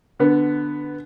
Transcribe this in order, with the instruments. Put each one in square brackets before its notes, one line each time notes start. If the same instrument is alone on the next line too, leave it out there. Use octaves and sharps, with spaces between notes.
[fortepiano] D3 B3